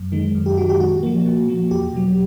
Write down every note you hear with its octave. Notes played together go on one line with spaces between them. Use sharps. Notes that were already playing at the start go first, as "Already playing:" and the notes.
Already playing: F#2
D#3 G#3
F#2
G4
D#3 G#3 F#4
G4
A#2 F#4
F3 A#3
A#2
F3 A#3
E2 G4
B2 F#3